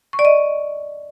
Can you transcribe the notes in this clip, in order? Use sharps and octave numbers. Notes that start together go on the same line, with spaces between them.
C#6
D5
D#5